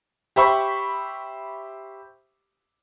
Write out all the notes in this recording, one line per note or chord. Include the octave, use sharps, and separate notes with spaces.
G4 C5 E5 B5 C#6